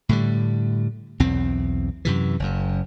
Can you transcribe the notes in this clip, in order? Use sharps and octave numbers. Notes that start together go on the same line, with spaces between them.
A2 D3 G3
B1 E2 C4
F#2 C3 E3
F#1 F#2